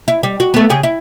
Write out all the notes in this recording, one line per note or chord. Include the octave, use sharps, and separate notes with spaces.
E4
G3
F#4
A3 B3
C#3 G4 G#4
E4